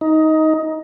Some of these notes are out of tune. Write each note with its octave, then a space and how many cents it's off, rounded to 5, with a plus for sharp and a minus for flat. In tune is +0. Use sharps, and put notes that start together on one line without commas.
D#4 +15